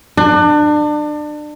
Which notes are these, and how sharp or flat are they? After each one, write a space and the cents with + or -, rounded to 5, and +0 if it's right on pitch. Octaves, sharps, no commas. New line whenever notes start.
D4 +30